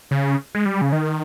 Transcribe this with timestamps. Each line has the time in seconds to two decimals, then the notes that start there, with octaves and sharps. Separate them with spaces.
0.11 C#3
0.55 G#3
0.66 G3
0.81 C#3
0.92 D#3